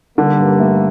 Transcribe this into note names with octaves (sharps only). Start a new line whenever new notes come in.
D3 G3 A#3
G2
A3